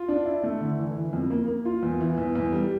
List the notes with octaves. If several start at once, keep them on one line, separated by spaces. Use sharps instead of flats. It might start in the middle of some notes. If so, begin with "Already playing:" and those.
Already playing: F4
D4
E4
A3
D3
E3
E3
F2
A#3
A#3
F4
E2
E3
E2
E2
G3